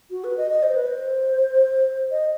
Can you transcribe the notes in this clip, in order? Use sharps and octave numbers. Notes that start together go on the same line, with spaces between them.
F#4
B4
D#5
D#5
C5
B4
C5
D#5